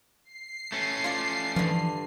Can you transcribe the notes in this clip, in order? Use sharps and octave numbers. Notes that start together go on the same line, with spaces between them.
C7
A3 C#4
F4 D5
G2 D3 E3 F3